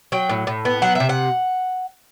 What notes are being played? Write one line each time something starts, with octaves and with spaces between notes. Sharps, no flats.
F#3 G5
A2
A2
B3
F#3 F#5
C3 E5
F#5